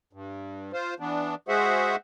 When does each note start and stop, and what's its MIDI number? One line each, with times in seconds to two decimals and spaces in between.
0.13 0.72 43
0.73 0.94 65
0.73 0.94 72
1.00 1.35 52
1.00 1.35 59
1.00 1.35 62
1.48 1.96 56
1.48 1.96 66
1.48 1.96 68
1.48 1.96 72
1.48 1.96 76
1.48 1.96 78